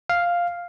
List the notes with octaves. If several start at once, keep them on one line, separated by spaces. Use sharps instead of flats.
F5